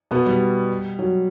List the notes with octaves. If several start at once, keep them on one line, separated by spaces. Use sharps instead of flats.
B2 B3
G3
F#3